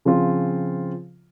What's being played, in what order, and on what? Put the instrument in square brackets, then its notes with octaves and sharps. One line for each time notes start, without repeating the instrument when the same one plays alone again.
[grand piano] C#3 F3 C4 F4